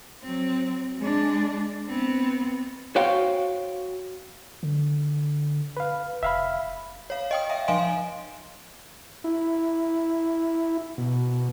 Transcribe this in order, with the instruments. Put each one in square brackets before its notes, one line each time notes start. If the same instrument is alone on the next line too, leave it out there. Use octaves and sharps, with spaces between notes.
[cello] F#3 C4
G#3 D4
B3 C4
[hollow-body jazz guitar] F#4 C5 C#5 F5 G5
[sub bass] D3
[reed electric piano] B4 F5
[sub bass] F1 [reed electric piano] E5 F5 B5
[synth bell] C#5 F5
D#5 G5 D#6
E5 F5 G5
F3 D#5 F5 G#5 C6 D7
[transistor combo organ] E4
B2